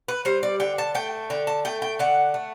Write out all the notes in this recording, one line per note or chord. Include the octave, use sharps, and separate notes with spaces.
B4
G3 C5
D5
D3 G5
A5
A3 G5
D3 G5
A5
A3 G5
G5
D3 F#5
A3